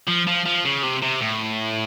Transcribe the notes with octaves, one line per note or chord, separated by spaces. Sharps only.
F3
F3
F3
C#3
C3
C3
A2